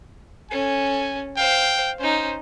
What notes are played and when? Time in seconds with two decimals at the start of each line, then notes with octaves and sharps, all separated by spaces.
0.51 C#4 A4 G#5
1.37 C5 F5 G5
1.99 C#4 D#4 C5